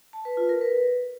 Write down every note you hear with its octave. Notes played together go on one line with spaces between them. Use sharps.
A5
B4
F4
A#4
B4